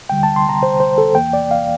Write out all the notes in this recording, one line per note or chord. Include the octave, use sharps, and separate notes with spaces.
D2 D3 G3 G5
A5
C6
A#5
C5
C5
A4
E2 E3 A#3 G5
D5
F5